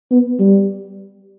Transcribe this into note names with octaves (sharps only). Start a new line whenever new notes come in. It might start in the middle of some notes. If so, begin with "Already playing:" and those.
B3
G3